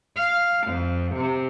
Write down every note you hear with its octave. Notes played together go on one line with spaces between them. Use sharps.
F5
F2
C3